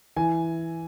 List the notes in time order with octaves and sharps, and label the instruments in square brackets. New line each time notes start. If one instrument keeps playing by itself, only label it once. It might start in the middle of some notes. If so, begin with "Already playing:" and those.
[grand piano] E3 G#5